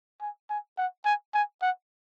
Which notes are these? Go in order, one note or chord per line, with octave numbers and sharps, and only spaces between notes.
G#5
G#5
F#5
G#5
G#5
F#5